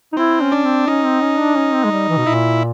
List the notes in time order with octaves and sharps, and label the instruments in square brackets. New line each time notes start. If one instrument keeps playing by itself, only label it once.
[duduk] D#4
[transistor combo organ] C4 [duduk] E4
[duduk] C#4
[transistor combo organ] D4
[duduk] C4
[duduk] C#4 [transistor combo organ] D#4
[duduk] C4
C#4
D4
C#4
C4
G#3
G3
E3
B2
[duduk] A#2 [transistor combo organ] E4